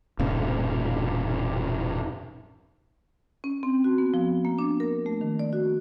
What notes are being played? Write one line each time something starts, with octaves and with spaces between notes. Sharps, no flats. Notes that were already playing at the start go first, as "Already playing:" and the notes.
E1 G2 A#2 C#3
C#4
C4
F#4
B3
F3
A#3
D4
A#4
A3
D#3
D5
F#4